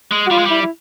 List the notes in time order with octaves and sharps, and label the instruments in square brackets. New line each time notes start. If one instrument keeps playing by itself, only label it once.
[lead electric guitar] G#3
[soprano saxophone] F#4
[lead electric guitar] G3 [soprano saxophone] F4
[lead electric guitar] G#3
[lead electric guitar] G3 [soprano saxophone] E4
[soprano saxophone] E4